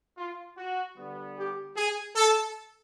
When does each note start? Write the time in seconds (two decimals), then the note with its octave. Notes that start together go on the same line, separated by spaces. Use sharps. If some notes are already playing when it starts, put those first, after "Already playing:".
0.17 F4
0.58 F#4
0.97 D3 G3 B3
1.37 G4
1.76 G#4
2.15 A4